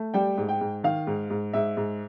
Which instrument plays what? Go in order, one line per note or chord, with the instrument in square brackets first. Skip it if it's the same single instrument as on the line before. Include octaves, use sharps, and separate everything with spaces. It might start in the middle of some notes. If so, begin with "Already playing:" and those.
Already playing: [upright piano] A3
G3 G5
G#2
G5
G#2
D#3 F5
G#2
G#2
G#2 E5
G#2